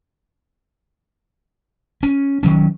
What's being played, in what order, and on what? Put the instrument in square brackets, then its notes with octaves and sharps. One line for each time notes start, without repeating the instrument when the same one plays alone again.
[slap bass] C#4
D#3 F#3 C#4